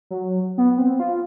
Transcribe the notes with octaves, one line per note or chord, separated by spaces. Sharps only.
F#3
B3
C4
F4